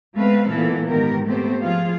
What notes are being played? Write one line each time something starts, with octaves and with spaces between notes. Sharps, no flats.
G#3 A3 B3 C4 B4 F5
A#2 E3 B3 A4
G#2 D#3 B3 G4 A#4
A3 B3 C4 G4 C5
F3 F4 G#4 F5